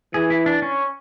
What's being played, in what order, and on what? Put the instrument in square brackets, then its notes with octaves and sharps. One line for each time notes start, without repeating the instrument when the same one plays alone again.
[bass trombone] E3 [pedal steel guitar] G#4
[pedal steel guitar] E4
D4
C#4